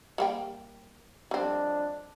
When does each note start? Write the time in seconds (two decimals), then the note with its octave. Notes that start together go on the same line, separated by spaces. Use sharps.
0.18 G3 A#3 G5
1.31 F2 G3 C4 D4